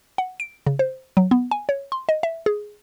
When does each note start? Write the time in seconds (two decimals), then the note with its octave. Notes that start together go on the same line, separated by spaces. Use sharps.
0.18 F#5
0.40 D7
0.67 C#3
0.79 C5
1.17 F#3
1.31 B3
1.51 G#5
1.69 C#5
1.92 C6
2.09 D#5
2.23 E5
2.46 G#4